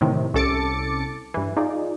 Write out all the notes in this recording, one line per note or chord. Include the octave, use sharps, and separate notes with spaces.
A2 C3 D#3 E3
C2 C#4 A4 D6 A6 C#7
G2 E3
D#4 F4 G#4 D5